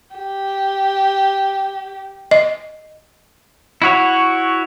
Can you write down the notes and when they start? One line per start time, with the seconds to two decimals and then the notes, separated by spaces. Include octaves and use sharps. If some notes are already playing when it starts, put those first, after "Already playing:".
0.16 G4
2.31 D#5
3.82 E4 F#4 C#5